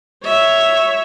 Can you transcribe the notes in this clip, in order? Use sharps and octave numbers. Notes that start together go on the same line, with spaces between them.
C#5 E5